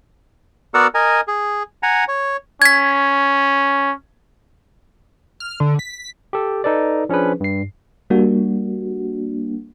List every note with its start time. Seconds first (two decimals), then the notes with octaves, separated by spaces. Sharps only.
0.74 B3 F#4 A#4 D5 F#5 E6
0.95 A#4 D#5 G#5
1.28 G#4
1.83 F#5 G#5 A#5
2.08 C#5
2.62 C#4 G#6 B6
5.40 F6
5.60 D3
5.79 B6
6.33 G4 A4
6.64 D#4 A4 B4 D5
7.09 F3 C#4 D4 G#4 B4
7.40 G2 C7
8.10 G3 A#3 D4 F#4